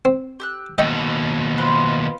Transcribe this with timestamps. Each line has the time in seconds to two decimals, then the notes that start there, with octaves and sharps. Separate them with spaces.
0.05 C4
0.40 G4 E6 F#6
0.78 D#2 B2 D#5 G5 C#6 E6
1.58 F4 B4 C5